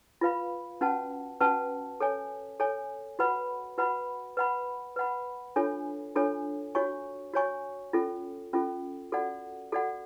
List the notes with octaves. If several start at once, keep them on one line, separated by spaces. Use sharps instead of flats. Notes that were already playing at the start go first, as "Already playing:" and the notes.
F4 B4 F5 B5
C#4 F#4 B4 F#5 A5
C#4 F#4 B4 F#5 A5
A4 C#5 G#5
A4 C#5 G#5
F#4 B4 F#5 B5
F#4 B4 F#5 B5
B4 F#5 B5
B4 F#5 B5
D4 F4 A4 C#5 G#5
D4 F4 A4 C#5 G#5
F#4 C#5 G#5 C#6
F#4 C#5 G#5 C#6
C#4 F4 A4
C#4 F4 A4
F#4 A4 D5 F#5
F#4 A4 D5 F#5